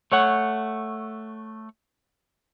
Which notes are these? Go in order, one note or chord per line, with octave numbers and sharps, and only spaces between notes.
A3 C#5 F#5